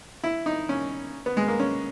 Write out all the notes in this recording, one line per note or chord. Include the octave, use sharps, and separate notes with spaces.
E4
D#4
C#4
B3
G#3
A#3
C#4